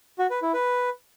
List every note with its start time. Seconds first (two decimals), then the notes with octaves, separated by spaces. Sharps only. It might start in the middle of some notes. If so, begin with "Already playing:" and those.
0.19 F#4
0.30 B4
0.42 E4
0.54 B4